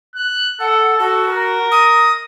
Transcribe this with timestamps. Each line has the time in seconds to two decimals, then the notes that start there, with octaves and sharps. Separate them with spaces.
0.16 F#6
0.60 A4 F#5
0.99 F#4 A4
1.29 A#4
1.71 D#6